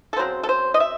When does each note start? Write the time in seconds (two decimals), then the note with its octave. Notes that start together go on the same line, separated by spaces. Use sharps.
0.13 A4
0.16 C#3 F#3 C4 C5
0.43 A4
0.49 C5
0.74 D#5
0.80 E5